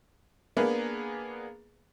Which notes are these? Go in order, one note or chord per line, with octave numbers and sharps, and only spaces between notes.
A#3 B3 D4 G#4 A#4 B4